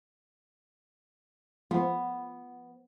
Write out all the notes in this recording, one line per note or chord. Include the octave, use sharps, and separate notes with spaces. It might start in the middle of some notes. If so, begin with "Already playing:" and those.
F3 B3